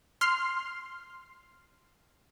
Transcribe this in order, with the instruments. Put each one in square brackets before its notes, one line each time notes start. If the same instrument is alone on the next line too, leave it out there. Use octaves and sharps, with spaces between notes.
[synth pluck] C6 F6 C7